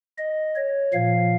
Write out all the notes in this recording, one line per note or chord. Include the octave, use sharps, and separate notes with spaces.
D#5
C#5
A#2 F3 F5